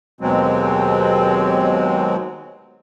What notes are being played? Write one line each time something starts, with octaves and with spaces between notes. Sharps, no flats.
D#2 B2 F#3 G#3 C4